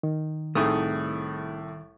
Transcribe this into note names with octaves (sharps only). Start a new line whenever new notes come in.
D#3
C2 A2 A3 D#4 G#4 D#6